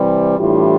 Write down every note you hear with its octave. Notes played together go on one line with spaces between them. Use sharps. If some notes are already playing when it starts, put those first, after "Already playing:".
Already playing: C3 E3 G3
A2 E3 G3 D4 F4